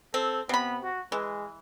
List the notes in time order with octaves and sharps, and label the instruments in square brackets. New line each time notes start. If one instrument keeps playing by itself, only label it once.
[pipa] C4 [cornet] A4
[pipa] C3 B5 [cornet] B3
[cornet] F#4
[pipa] E3 [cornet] G#3